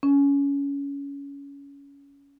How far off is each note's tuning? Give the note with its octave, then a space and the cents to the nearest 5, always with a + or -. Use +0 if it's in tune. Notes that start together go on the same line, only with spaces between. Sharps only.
C#4 +20